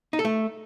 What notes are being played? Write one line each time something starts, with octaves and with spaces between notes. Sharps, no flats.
D#4
A4
A3